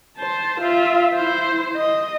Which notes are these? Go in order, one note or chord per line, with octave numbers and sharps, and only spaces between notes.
C5 A5
F4 E5
E4 C5
D#5